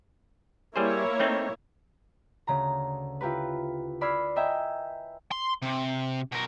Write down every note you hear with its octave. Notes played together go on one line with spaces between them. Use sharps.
G3 A#3 E4 G#4 C5 C#5
A3 C4 D#4
D2 C#3 A#5
E4 F4 G4 A#4 B4
D5 B5 E6 F6 G#6 C7
A#4 D#5 E5 G5 G#5
C6
C3
B2 A#4